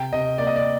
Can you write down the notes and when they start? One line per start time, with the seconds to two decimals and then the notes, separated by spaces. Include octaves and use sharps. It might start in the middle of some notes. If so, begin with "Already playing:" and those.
Already playing: C3 G5
0.12 C3 D#5
0.38 A#3 D5
0.47 D#5
0.56 D5